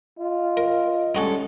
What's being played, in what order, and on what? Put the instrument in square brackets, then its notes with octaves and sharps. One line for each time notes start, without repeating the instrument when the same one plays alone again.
[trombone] F4 [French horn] D#5
[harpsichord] A#4
[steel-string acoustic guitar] G3 G#3 A4 [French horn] C#4 [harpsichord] D#4 F#4 G#4